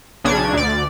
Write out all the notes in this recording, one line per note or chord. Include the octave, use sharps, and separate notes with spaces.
B1 C#3 D4 G#6
D2 D5